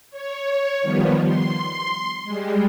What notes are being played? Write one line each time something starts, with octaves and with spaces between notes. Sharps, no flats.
C#5
D#3 F3 G3 B3
C6
G3 G#3